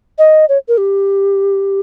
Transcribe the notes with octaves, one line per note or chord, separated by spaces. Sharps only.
D#5
C#5
A#4
G4